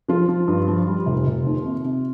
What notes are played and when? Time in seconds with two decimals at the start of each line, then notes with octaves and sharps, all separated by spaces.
0.08 F3 F4
0.28 F3
0.48 G2
0.68 F3
0.87 G3
1.06 F1
1.27 F1
1.46 D#2
1.65 C3
1.84 C3